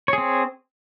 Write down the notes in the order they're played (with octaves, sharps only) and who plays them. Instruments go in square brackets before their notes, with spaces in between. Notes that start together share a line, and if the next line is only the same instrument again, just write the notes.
[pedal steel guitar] C#5
G#4
C4